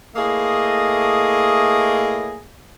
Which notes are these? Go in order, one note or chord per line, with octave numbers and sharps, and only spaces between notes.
A2 A3 A#3 G#4 D#5